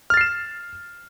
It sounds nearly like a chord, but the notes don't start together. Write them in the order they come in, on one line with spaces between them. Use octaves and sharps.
F6 A6 C7 E7